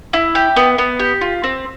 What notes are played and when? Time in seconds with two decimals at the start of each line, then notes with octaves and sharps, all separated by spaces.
0.13 E4
0.35 G4
0.56 B3
0.78 B3
0.99 G4
1.21 F4
1.44 C4